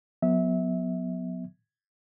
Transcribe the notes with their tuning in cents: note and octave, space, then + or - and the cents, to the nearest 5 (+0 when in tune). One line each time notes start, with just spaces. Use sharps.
F#3 -40 B3 +0 E5 -25